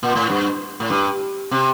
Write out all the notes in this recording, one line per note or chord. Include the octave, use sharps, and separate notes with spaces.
A#2
A2
G2
A2
G2
C3